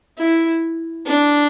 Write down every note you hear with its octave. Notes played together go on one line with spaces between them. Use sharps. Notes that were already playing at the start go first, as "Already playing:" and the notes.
E4
D4